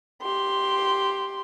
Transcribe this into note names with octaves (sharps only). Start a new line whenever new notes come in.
G4 C6